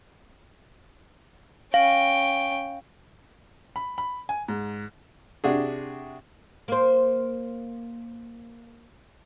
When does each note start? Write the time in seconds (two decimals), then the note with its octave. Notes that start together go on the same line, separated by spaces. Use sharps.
1.74 C#4 F5 G5
3.76 B5
3.98 B5
4.29 G#5
4.48 G#2
5.44 C3 D4 F#4 G#4
6.68 A#3 C5